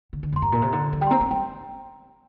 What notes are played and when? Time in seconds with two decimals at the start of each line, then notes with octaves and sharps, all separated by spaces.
0.13 D3
0.23 D3
0.32 F2 C6
0.42 G2 A#5
0.52 A#2
0.62 C3
0.72 D3
0.93 F3
1.01 G3 G5
1.07 C6
1.10 C4 A#5
1.21 A#3
1.31 G3 G5